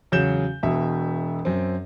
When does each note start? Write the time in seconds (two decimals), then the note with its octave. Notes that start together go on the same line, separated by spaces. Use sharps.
0.12 E2 C#3 F#3 G6 E7
0.63 E1 B2 E5
1.45 F#2 C4